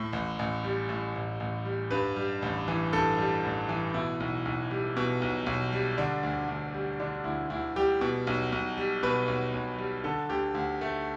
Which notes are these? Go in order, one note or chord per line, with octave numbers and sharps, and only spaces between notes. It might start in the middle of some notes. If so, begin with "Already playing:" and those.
Already playing: A2
A1
A1
G3
A2
A1
A1
G3
G2 B4
G3
A1
E3
G2 A4
G3
A1
E3
B2 E4
B1
B1
G3
B2
B1
B1
G3
D3 D4
D2
D2
G3
D3 D4
D2 E4
D2 E4
G3 G4
B2
B1
B1
G3
B2 B4
B1
B1
G3
D3 A4
D2 G4
D2
A3